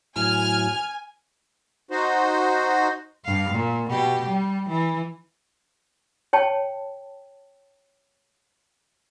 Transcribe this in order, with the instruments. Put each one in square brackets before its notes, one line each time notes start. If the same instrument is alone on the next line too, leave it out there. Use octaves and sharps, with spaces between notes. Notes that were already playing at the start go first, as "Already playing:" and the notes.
[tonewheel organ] A2 F#3 E4 [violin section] G#5 [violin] F6
[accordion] D#4 F#4 C5
[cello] G2 F5
A#2
B2 G4
G3
E3
[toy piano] C#5 G5 A5